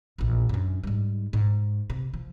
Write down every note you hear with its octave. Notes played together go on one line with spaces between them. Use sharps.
A#1 E2
F#2 D4
G#2 G3
G#2
C3
F3